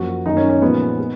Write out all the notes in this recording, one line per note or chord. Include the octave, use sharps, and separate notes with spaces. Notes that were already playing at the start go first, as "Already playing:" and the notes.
Already playing: F#2 F3 A#3 F#4
F#2 D#3 A#3 D#4
C#4
C#4
A#2 F3 G#3 B3
G#3